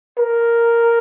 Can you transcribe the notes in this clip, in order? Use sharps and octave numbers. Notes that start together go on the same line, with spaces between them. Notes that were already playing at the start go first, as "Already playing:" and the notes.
A#4